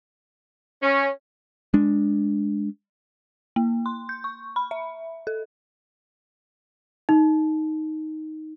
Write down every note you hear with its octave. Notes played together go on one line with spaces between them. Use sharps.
C#4
G#3 D4
A#3
C6
G6
C#6
B5
E5
A4
D#4